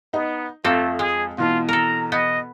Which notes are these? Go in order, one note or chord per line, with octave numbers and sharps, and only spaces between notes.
B3 D#4
F2 A3 A#3 C4 A4
G#3 G#4
B2 E3 F4 A5
A4 A#4 A#5
B3 D#5